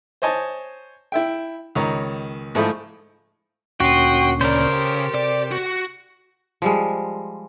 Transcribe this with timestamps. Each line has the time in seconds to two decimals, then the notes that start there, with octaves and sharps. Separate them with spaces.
0.22 C5 C#5 D#5 G#5 A5
1.12 E4 E5 G5
1.75 C#2 D#3 C#5 A#5
2.55 G#2 F3 A3 E4 B5 D#6
3.80 D2 A#2 C#4 F#4 G5 C6 D#6
4.41 C#3 A#4 C5 D5
4.73 G4 A4
5.14 C3 D5
5.52 F#4
6.62 F3 G3 G#3